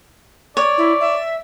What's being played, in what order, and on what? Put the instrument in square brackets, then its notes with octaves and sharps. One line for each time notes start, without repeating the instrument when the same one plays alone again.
[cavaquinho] C#5 [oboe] D5
[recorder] E4
E5